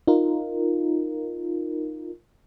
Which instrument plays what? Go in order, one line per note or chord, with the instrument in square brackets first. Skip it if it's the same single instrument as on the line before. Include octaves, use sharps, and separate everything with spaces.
[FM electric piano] D#4 F4 A#4